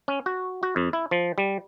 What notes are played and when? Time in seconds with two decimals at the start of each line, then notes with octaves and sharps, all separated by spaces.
0.08 C#4
0.26 F#4
0.63 F#4
0.76 F2
0.93 E4
1.11 F3
1.38 G3